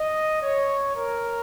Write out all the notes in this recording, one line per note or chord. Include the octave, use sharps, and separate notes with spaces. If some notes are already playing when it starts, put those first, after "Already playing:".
Already playing: D#5
C#5
A#4